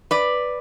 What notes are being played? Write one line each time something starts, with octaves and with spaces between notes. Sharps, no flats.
B4 D5